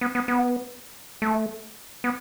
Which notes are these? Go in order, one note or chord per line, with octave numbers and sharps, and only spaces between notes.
B3
B3
B3
A3
B3